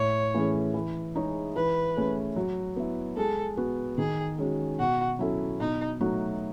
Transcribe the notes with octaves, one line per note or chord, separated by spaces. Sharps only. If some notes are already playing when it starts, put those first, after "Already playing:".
Already playing: A2 C#5
E3 A3 C#4 G#4
E3
G#3 D#4 G#4 C#5
E3 B4
A3 C#4 G#4
F#3
B3 E4
G#3 A4
B3 F#4
D#3 G#4
G#3 C#4 F#4
B2 F#4
F#3 C#4 E4 A4
B2 D#4
F#3 A3 D#4 F#4